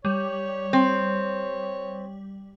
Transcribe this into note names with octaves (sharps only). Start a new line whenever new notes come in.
G3 C#5
C4